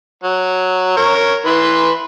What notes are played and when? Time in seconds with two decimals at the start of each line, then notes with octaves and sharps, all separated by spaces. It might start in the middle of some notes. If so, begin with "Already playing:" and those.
0.23 F#3
0.97 A#4 C#5
1.46 E3 B4 C6